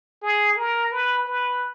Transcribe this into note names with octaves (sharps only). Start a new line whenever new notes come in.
G#4
A#4
B4
B4